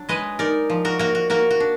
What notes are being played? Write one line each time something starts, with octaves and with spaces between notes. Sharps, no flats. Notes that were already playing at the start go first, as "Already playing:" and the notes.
Already playing: F#3 D4
G#3 B4 D#5
D#4 A#4 D5
F3
F#4 A#4
A#3 F#4 A#4
F#4
A#3 F#4 A#4
F#4
D4